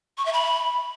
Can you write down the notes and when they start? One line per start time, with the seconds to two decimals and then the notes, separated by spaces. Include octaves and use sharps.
0.18 C#6
0.25 E5
0.33 B5